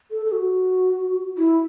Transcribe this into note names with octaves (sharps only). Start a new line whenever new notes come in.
A4
A4
F#4
E4